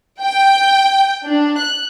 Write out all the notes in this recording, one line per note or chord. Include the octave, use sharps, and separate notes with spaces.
G5
D4
F#6